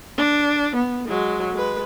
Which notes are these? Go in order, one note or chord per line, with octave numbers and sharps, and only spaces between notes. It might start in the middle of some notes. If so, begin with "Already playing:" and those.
D4
B3
F#3 G#3
G#3 B4